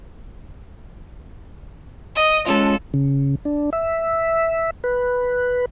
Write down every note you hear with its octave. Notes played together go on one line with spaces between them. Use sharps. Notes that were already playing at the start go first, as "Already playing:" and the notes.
D#5
G#3 C#4 F4 A4
C#3
D4
E5
B4